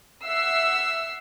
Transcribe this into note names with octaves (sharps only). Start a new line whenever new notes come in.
E5 F#5 E6 C7